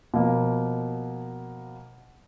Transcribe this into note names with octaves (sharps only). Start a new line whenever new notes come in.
B2 F3 A#3